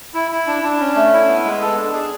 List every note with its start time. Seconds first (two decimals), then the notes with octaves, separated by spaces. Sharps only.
0.14 E4
0.31 E4
0.47 D4
0.63 D4
0.80 C#4
0.96 A3
1.13 E4
1.29 B3
1.45 G#3
1.61 A4
1.77 D4
1.94 G#4